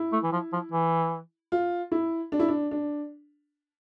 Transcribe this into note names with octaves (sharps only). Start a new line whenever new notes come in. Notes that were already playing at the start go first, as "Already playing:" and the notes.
Already playing: E4
A3
E3
F3
F3
E3
F4
E4
D4
E4
D4
D4